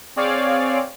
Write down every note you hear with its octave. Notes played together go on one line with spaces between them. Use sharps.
C4 G#4 C#5 D5 F5